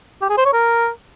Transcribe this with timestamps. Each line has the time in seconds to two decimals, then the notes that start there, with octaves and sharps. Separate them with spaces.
0.22 G4
0.30 G#4
0.37 C5
0.45 C#5
0.53 A#4